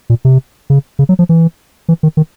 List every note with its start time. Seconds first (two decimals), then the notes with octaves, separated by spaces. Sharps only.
0.10 A#2
0.25 C3
0.70 C#3
0.99 C#3
1.09 F#3
1.19 F3
1.29 E3
1.89 E3
2.03 D#3
2.17 D#3